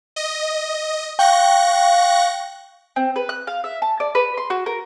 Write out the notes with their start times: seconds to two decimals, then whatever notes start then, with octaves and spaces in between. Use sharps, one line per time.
0.16 D#5
1.19 F5 G5 C#6 F#6 A#6
2.96 C4
3.16 B4
3.29 F#6
3.47 F5
3.64 E5
3.82 A5
4.00 D5
4.15 B4
4.37 C6
4.50 F#4
4.66 A#4